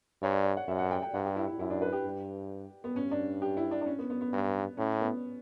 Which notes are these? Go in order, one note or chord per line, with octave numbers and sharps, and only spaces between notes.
G2 C#5
D5
C#5
F#5
F#2 E5
F#5
G5
G5
G2 F#5
G4
E4
E4
F#2 E4
D4
B4
G4
G2
B3
G2 C#4
D4
G4
E4
D4
D4
C#4
B3
B3
B3
G2
A2 C#4
B3